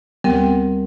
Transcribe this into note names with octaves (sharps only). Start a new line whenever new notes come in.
D2 G3 B3 C4 A#4